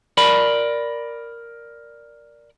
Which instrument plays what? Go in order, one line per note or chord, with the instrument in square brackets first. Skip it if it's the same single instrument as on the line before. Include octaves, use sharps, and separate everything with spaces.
[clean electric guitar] A#4 D5 B5